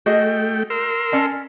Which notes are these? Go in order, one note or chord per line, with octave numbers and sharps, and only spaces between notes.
A3 F#4 G#4 D#5 G5
A#4 C6 E6
C#4 D5 A5